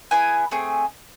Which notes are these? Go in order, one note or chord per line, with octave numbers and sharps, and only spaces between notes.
B3 E4 G#4 G#5
A3 C4 G#4